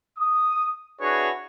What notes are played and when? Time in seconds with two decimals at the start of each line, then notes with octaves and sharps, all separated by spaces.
0.19 D#6
1.01 D4 E4 F#4 G#4 B4 C#5